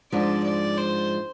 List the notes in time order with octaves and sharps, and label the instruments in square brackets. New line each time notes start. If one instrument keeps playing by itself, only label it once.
[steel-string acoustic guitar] G#2 F3 G#3 D4 [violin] D5
[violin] D5
C5